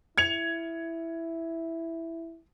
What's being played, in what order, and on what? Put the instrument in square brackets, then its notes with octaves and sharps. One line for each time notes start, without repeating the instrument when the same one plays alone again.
[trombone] E4 [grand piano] G#6 C#7 F7